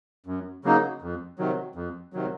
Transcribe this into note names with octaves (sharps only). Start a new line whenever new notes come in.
F#2
C#3 F#3 A#3 D#4
F2
C3 D#3 F#3
F2
C3 D#3 F#3